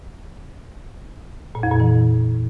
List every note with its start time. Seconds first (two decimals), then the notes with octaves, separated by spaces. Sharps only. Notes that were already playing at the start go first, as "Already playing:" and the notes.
1.55 A#2
1.63 F2
1.72 A#2
1.80 E3